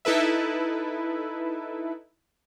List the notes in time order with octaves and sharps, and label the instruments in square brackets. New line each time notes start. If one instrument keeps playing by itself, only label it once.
[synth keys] D#4 E4 A4 B4 E5